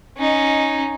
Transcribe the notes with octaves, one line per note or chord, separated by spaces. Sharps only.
C#4 D#4